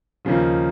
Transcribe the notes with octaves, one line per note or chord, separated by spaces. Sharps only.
D#2 C#3 F3 A#3 D#4